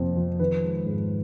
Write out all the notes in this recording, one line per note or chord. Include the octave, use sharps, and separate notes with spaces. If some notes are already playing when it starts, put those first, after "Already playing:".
Already playing: F2 C3 F3 A#3 C5
F3
D#3 B4
G#3
G#2